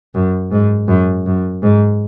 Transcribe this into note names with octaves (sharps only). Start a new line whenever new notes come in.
F#2
G#2
F#2
F#2
G#2